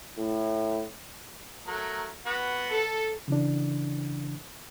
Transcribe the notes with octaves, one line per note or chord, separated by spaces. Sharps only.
A2
F#3 A3 A#4
B3 F#4 F#5
A4
C#3 E3 D4